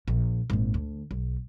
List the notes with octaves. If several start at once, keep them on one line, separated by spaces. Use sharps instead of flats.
A#1
G#1 A#2
D2
B1